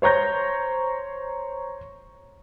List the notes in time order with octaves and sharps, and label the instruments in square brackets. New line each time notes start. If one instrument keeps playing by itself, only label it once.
[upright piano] C5 C#5 A#5 G6 A#6